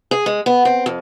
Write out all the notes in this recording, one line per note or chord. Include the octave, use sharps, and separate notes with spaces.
G#4
G#3
B3
C4
F2